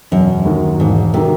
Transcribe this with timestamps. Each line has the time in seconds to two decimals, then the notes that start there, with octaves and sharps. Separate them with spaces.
0.12 E1 F#2
0.45 D#2 D#3 F#3
0.80 E1 G#2
1.14 C3 D#3 F#3